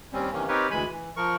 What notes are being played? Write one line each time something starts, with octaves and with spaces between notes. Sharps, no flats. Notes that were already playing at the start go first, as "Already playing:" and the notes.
D#2 G3 C4 C#4
C3 D#3 E3 A#3 C#4
C4 D#4 G4 A#4 B4 C#5
D2 E3 G#3 G#5 B5
E3
F3 A#4 C#6